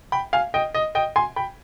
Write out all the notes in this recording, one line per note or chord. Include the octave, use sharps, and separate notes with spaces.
G5 B5
F5 G#5
D#5 G5
D#5
D#5 G5
G#5 C6
G5 B5